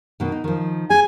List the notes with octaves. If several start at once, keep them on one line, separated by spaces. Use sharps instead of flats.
B2 D#3
D#4
D#3 F3
G#4 G#5